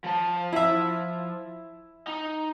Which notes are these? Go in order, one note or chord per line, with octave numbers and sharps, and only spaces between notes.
F3 A5
E4 E5
D#4